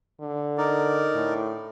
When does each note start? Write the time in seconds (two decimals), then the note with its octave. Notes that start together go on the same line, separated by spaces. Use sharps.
0.21 D3
0.58 D#4 A#4 D5
1.15 A2